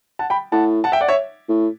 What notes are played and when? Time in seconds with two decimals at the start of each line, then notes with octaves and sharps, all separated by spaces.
0.19 F#5 A5
0.30 G5 B5
0.52 A2 F#5 A5
0.84 F#5 A5
0.92 E5 G5
1.01 D5 F#5
1.08 C#5 E5
1.49 A2